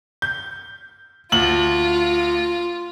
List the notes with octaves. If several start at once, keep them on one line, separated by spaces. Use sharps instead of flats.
G6
D2 F4 F#7